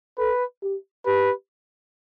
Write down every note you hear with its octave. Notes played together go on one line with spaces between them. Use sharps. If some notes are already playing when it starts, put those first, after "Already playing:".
A4 B4
G4
G4 B4